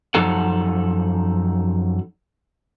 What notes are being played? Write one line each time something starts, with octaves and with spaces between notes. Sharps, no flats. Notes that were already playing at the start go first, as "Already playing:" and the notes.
F#2 F3 D#4 A4 F#5